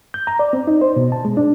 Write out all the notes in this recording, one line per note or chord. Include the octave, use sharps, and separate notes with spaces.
G6
A#5
D5
C4
D#4
C5
B2
A5
G#3
D4